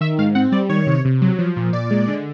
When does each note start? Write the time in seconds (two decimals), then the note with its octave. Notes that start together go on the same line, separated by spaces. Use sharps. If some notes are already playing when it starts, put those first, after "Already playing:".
0.01 D#3 E5
0.19 G#2 F5
0.35 C4 F#5
0.52 G3 D5
0.69 D#3 C#5
0.87 C3
1.05 C3
1.22 F#3
1.39 F3
1.56 A#2
1.73 A#2 D5
1.90 G#3
2.08 D3